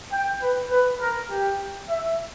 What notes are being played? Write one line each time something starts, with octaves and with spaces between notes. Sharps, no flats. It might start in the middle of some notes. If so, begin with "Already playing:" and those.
G5
B4
B4
A#4
G4
E5